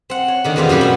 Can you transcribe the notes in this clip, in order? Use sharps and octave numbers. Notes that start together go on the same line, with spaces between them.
C4 F#5
C#5
D3 D#3 A#3
E2 B2 A3 C4 G4 F5
F#2 G3 F4 G4 F#5 G#5
B2 A3